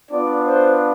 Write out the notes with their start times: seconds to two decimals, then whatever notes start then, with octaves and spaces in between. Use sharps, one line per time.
0.11 B3 D4 F4 D5
0.45 C5